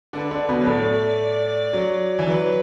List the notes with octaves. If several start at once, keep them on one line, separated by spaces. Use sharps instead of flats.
D3 D4 B4
D3 D4
B2 B3
F#3
A2 A3 D5
F#3
E3
F#3 B4